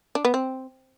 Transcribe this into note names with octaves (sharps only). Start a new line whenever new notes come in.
D4
B3
C4